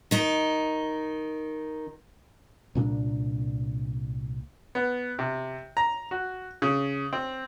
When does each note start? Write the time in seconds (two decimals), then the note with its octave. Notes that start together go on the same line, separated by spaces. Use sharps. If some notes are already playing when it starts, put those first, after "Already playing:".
0.11 D#3 D#4
2.75 C2 A#2 C#4 D4
4.75 B3
5.19 C3
5.77 A#5
6.11 F#4
6.62 C#3
7.13 C4